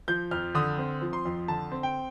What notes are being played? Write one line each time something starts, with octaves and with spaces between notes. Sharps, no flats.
F3 G6
F2 F6
D3 D#6
C4
F3
C6
F2
D3 A5
C4
G5